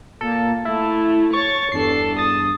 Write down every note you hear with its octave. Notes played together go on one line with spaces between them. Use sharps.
A#2 A#3 A4
A3 E4 A5
C#5 C#6 A6
E2 G2 D4 A4 C7
A5 D#6